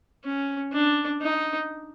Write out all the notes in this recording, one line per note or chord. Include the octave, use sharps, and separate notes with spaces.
C#4
D4
D#4